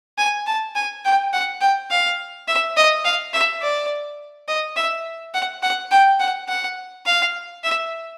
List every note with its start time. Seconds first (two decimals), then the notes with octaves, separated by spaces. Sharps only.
0.18 G#5
0.46 A5
0.75 G#5
1.05 G5
1.33 F#5
1.61 G5
1.91 F5
2.48 E5
2.77 D#5
3.05 F5
3.33 E5
3.62 D5
4.48 D#5
4.76 E5
5.34 F#5
5.63 F#5
5.91 G5
6.20 F#5
6.48 F#5
7.06 F5
7.64 E5